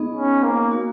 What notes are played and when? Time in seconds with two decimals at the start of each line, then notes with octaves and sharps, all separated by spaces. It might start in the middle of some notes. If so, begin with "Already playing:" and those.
Already playing: B3 D#4 G#4 D#5
0.15 C#4
0.43 A#3
0.71 A#3 D#4 F#4